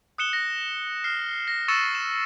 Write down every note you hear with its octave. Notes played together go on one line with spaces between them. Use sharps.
D#6 F#6 C#7 E7 G7
A#6
F6 C7
A#6
C#6 E6 A6 C#7 D#7 E7
E7